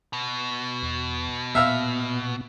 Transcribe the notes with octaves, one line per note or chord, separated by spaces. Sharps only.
B2
E2
A#2 B3 E5 F5 E6